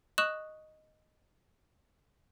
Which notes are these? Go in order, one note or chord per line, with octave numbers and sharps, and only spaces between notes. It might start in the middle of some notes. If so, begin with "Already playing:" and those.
D#5 C#6 D#6 F#6 E7 F#7